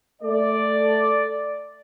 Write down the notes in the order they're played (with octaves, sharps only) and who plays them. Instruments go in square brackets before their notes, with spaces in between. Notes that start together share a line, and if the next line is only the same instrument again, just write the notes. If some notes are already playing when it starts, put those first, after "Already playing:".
[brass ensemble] A3 D5